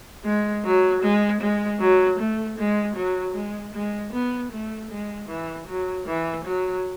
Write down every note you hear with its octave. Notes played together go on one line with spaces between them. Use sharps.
G#3
F#3
G#3
G#3
F#3
A3
G#3
F#3
G#3
G#3
B3
A3
G#3
E3
F#3
E3
F#3